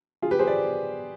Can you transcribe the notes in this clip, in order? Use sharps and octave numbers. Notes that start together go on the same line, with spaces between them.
F4 G#4
G4 B4
G#4 C5
B4 D5